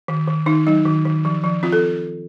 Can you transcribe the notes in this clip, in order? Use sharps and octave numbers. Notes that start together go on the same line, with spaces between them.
D#3
D#3
D#3 D#4
F#3 D#4
D#3
D#3
F3
F3
C4 F4
A4